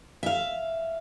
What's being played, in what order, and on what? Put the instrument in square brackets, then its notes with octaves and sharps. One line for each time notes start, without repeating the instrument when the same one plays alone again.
[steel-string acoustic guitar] E5 F5